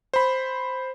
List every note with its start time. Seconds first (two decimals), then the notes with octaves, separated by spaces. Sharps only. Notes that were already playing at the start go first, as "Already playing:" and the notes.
0.14 C5 B5